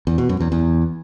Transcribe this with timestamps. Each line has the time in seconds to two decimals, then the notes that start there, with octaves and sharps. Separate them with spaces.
0.07 E2
0.18 B2
0.29 F#2
0.40 E2
0.52 E2